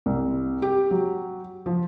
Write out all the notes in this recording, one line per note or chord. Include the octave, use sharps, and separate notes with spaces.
C2
G4
F#3
F3